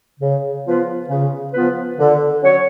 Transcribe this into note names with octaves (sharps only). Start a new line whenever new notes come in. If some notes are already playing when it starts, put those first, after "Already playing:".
C#3
F3 B3 F4 B4
C#3
F3 B3 F4 B4
D3
F#3 C#4 F#4 C#5